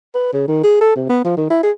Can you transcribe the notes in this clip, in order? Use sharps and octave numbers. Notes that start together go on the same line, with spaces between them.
B4
C#3
D#3
G#4
A4
C3
B3
F3
D#3
E4
G#4